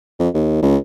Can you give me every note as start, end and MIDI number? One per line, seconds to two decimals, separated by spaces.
0.19 0.29 41
0.34 0.58 39
0.62 0.77 37